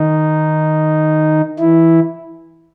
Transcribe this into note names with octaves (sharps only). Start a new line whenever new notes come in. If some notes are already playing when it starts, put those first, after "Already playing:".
Already playing: D#3 D#4
E3 E4